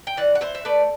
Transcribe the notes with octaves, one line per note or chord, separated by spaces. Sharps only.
G5
E3 D5 F#5
F#5
E3 C5 E5
E5
A3 B4 D5